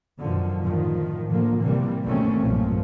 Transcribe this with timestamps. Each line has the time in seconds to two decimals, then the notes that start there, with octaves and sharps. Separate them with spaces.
0.21 F#2 B2 D3 D#3 F3
0.64 A2 D#3 F3
1.29 A2 D3 F3 A#3
1.62 C3 E3 G3 A#3
2.04 F#2 B2 D#3 A3 C4 C#4
2.39 B1 G2 A#2 F3